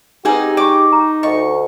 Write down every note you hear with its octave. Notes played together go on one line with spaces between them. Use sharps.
C4 D#4 G4 G#4 B4 F#5 G#5
D5 C#6 D6
A#5
D2 D#5 C#6